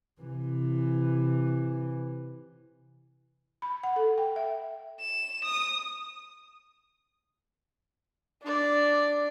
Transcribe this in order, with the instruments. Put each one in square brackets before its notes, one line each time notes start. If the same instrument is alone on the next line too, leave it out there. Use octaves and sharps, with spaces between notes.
[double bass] C3 E3
[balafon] B5
F#5
A4
G5
E5
[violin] E7
D#6
[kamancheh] D4 D5